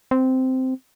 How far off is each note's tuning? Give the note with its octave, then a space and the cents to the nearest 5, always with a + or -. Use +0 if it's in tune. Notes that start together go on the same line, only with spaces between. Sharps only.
C4 -10